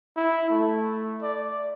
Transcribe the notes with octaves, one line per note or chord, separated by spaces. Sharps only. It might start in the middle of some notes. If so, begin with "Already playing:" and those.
E4
A3
D5